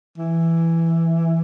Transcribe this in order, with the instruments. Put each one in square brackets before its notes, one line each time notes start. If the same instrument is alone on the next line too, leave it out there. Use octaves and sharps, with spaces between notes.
[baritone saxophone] E3